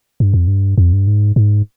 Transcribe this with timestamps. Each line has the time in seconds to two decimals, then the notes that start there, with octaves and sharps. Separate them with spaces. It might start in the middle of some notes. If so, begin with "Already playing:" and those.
0.20 G2
0.34 F2
0.47 G2
0.78 F2
0.93 G2
1.07 G#2
1.36 G#2